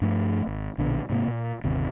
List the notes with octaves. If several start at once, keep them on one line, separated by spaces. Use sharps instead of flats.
G2 F3 A3
G#1
A#1 B2 D3
G#2 C3 A#3
A#2
G1 D#2 C3